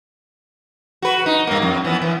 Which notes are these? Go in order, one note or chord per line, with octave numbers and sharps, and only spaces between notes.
F#4 B4
D#4
G2 A#3
F2
E3 B3
E3